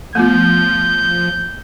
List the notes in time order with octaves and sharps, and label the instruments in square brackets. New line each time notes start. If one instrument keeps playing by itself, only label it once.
[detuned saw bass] F3 [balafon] A3 B3 F4 [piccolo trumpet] G6